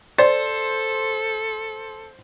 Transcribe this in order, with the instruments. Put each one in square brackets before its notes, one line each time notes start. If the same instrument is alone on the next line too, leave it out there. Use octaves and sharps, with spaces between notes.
[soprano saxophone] A4 [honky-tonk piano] C5 [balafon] D5